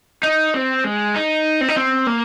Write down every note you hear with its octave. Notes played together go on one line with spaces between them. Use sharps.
D#4
C4
G#3
D#4
C4
D#4
C4
A#3